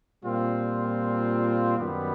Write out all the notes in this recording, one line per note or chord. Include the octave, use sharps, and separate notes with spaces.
A#2 G3 C4 F4
F#2 D#3 G3 B3